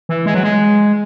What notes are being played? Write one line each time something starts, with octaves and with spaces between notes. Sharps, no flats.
E3
G#3
F#3
G#3